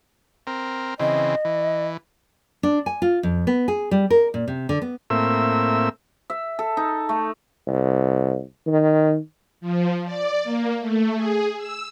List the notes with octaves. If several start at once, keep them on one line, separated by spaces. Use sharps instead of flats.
C4 A#4
C#3 E3 C4 D#5
E3
D4
G#5
F4
F2
B3
G#4
G3
A#4
A#2
C3
D3
B3
A2 A#3 C4 E5 E6
E5
A4
D#4
A3
C2
D#3
F3
D5
A#3
A3
G#4
E6